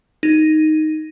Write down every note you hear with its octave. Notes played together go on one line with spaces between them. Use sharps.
D#4